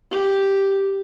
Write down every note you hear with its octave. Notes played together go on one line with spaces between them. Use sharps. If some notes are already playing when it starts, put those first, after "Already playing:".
G4